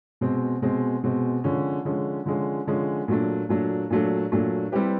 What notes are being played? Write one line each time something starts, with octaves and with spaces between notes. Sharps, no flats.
B2 G#3 C4
B2 G#3 C4
B2 G#3 C4
D3 F3 G#3 C#4
D3 F3 G#3 C#4
D3 F3 G#3 C#4
D3 F3 G#3 C#4
A#2 F#3 A3 D4
A#2 F#3 A3 D4
A#2 F#3 A3 D4
A#2 F#3 A3 D4
G3 C4 E4 G4 B4